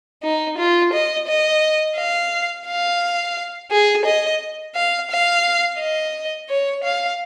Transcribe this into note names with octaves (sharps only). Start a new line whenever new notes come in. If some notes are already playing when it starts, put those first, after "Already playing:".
D#4
F4
D#5
D#5
F5
F5
G#4
D#5
F5
F5
D#5
C#5
F5